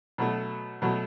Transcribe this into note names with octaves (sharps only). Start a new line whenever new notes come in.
B2 F#3 A3
B2 F#3 A3